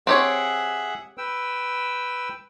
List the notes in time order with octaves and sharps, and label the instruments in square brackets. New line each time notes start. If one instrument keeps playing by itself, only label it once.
[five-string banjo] C4 G4 C#5 [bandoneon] G#4 E5 F#5
[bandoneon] B4 G5 E6